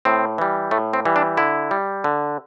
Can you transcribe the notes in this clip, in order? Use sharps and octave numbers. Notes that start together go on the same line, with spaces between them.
A2 C4
E3 G3
A2 A3
C4
E3 G3
D4
D3 E4
G3
D3